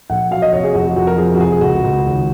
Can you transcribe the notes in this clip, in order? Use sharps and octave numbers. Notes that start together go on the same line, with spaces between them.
A#1 F#5
F#3 F5
D#5
F1 C#5
G#4
F2 F#4
F#4
F2 F#4
A#4
F3 G#4
F#4
F1 G#4
G#4
C#2 F#4
C#2
D#2